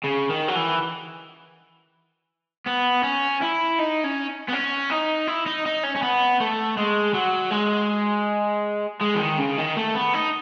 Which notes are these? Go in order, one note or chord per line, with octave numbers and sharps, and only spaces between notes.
C#3
D#3
F#3
E3
B3
C#4
E4
D#4
C#4
B3
C#4
D#4
E4
D#4
D#4
C#4
C#4
B3
A3
G#3
F#3
G#3
G#3
E3
D#3
C#3
D#3
A3
B3
D#4